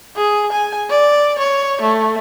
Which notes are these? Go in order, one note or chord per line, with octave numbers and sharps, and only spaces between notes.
G#4
G#5
D5
C#5
A3